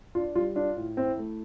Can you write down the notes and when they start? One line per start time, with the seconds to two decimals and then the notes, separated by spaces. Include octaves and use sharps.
0.15 D4 F4
0.35 G3 F4
0.55 D4 F4
0.77 A2
0.97 C4 E4
1.18 A3